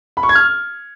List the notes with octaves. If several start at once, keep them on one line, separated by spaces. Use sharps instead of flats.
B5
C#6
G#6
F6